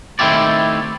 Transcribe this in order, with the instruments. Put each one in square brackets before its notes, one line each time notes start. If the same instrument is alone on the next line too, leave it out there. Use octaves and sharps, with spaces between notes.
[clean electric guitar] D#3 A3 C4 E4 G4 D5